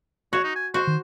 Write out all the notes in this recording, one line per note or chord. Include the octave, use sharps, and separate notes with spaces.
F#4 C#5
D#4
G#5
F#4 C5
D#3